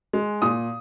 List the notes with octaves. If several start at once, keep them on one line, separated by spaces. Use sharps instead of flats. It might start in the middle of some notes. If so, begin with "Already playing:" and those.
G#3
A#2 D#6